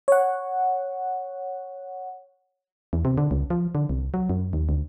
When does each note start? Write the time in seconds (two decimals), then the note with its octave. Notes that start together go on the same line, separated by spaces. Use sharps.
0.08 C#5 F#5
2.93 E2
3.05 C3
3.18 D3
3.31 C#2
3.50 F3
3.75 D3
3.89 C2
4.14 F#3
4.30 F#2
4.53 D#2
4.69 D2